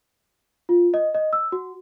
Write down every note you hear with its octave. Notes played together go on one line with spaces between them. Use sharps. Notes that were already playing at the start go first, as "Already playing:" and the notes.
F4
D#5
D#5
E6
F#4